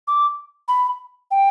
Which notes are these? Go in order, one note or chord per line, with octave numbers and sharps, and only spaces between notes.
D6
B5
G5